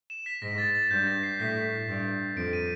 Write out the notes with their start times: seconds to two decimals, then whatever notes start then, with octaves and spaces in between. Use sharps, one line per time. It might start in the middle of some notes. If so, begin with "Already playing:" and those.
0.10 E7
0.26 B6
0.42 G#2 A#6
0.58 A6
0.75 A6
0.91 G2 G6
1.07 A#6
1.23 C7
1.40 A2 B6
1.88 G2
2.37 F2 D7
2.53 D#7